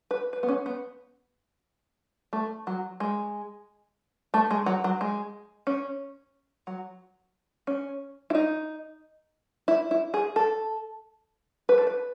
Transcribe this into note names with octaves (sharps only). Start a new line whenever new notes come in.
B4
B4
B3
C#4
B3
A3
F#3
G#3
A3
G#3
F#3
F#3
G#3
C#4
F#3
C#4
E4
D#4
E4
E4
G#4
A4
B4
A4
B4